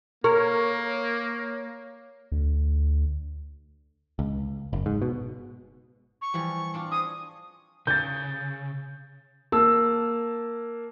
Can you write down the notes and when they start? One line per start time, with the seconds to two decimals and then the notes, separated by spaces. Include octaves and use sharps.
0.24 A#3 A#4 C#5
2.32 D2
4.19 C#2
4.73 F#1
4.86 G#2
5.02 B2
6.22 C#6
6.34 E3 F3 G3
6.74 C4 D4 F4
6.91 G#4 D#6
7.87 C#3 G6 A6
9.52 A#3 A5 E6